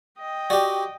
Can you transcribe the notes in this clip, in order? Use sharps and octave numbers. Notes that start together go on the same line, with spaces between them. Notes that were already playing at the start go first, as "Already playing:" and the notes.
D#5 G5
F#4 G4 D5